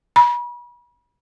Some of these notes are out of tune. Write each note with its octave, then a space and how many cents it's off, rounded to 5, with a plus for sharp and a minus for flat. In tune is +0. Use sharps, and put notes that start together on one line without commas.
B5 -40